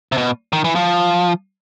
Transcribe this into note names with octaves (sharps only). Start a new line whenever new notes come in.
C3
B2
D#3
E3
F3